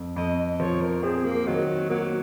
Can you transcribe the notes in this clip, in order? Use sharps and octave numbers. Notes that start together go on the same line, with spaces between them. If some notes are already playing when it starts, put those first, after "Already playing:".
Already playing: F2
F2 D#5
F3 C#5
A#4
C4 G#4
A#3
D#3 F#3
F#3 A#3